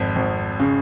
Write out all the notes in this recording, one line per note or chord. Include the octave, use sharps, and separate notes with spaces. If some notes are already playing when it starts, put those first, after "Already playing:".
Already playing: G#1 F2
G#1
C#3